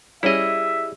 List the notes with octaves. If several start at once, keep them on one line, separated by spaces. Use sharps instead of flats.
G3 C#4 E4 G#4 D#5 E5